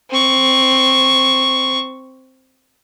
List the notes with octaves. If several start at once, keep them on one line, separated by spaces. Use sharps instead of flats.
C4 C#6